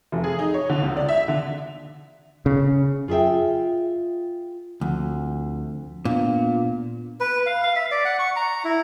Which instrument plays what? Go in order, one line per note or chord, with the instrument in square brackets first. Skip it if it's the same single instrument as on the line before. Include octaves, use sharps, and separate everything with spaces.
[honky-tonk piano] F1
G#4
D#4
C#5
D3
C#2
D5
E5
D3
[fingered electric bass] C#3
[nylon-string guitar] F4 G#4 A4 E5 G5
[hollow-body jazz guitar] D2 [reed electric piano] F3 C4
[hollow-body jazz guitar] A#2 [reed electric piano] B3 D4 F5
[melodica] B4
F5
F5
E5
D5
F#5
C#6
A#5
E4